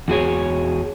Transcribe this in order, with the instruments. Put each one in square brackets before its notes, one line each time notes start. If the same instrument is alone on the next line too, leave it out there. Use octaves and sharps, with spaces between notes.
[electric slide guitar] E2 F#4 G#4 C#5